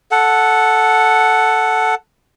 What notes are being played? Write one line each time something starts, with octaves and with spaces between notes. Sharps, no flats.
A4 F#5